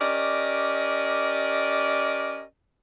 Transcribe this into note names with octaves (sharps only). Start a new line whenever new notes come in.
C#4 G4 A#4 D5 D#5